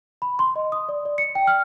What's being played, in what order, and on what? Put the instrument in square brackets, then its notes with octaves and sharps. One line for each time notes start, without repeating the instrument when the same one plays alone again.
[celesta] B5
C6
D#5
D#6
D5
D5
C#7
G5
F6